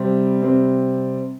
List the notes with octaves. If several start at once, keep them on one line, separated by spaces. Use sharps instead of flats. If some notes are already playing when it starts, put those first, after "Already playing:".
Already playing: C3 G3 C4
C3 G3 C4